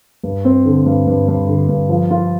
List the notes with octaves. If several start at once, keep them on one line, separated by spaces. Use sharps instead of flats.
G2
C4
D3
G2
G2
G2
D3
G2
F3
F4